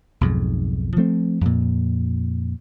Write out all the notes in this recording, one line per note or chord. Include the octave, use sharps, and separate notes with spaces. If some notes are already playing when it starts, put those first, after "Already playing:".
B1 F2 G#2
F3 A3 C4
F2 A#2